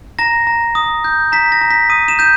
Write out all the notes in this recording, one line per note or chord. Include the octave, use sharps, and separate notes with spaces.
A#5 A#6
A#5
D#6
G6
A#5 B6
A#6
A#5
B6
D#6 D#7
E7
G6 E7